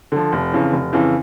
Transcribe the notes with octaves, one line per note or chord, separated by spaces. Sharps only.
D3 F3
F1
F2 C#3 E3
F1
F2 C#3 E3